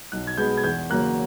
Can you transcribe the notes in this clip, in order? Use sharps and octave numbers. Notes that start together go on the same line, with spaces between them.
B1 F#6
G#6
B2 G#3 B3 G6
G#6
E2 G6
C#3 F#3 A#3 F#6